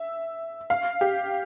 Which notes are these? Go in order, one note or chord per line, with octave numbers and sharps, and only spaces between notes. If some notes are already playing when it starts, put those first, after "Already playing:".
Already playing: E5
F5
G4